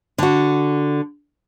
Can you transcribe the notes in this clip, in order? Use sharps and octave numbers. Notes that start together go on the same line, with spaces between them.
D3 F#4